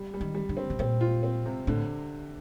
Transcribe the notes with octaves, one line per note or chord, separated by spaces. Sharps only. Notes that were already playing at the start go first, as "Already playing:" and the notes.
Already playing: G3
G3
D#3
G3
D3
C4
C3
A#2 C4
F4
C4
C3
A2 D3